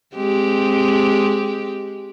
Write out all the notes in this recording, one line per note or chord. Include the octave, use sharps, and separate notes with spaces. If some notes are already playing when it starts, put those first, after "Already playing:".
G#3 C4 G4